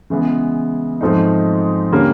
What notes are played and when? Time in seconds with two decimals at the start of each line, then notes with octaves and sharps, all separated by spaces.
0.10 C#3 E3 G#3 B3 E4
1.01 G#2 F3 A3 C4 D#4
1.92 D3 G3 A#3 C#4